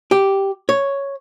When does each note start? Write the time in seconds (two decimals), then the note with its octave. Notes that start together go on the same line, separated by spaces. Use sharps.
0.11 G4
0.69 C#5